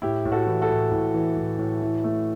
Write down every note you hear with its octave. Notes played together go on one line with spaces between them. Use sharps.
A2 E4 G4
A2
F#4 A4
E3
F#4 A4
A2
A2
E3
A2
A2
E3
A3